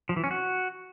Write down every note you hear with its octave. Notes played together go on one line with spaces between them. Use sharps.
F3
E3
C#4
F#4